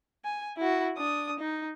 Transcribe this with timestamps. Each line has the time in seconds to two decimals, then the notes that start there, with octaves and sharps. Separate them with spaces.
0.24 G#5
0.57 E4 F#4
0.97 D4 D#6
1.39 D#4